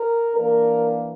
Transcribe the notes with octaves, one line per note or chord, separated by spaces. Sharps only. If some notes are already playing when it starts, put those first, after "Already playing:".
Already playing: A#4
E3 A#3 D4 A#4